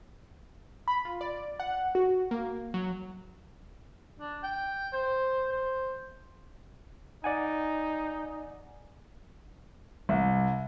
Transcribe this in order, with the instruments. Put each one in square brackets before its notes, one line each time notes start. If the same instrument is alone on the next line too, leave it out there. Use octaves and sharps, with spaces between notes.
[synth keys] B5
F4
D5
F#5
F#4
A#3
F#3
[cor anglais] D4
G5
C5
C5
[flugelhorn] D#4 [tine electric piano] D5 F#5 G#5
[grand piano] C2